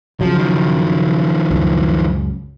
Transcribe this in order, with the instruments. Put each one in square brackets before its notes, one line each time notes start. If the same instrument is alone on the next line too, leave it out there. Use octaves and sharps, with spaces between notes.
[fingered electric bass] C#3 F#3 [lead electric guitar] F3
[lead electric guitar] D#3 F3
[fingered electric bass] C#2 F#2